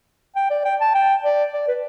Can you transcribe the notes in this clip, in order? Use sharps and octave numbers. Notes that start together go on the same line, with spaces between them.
G5
D5
G5
A5
G5
D5
D5
B4